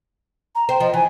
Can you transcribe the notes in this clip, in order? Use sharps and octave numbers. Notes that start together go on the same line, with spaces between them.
A#5
C5 G5
F3 D#5
E3 G#5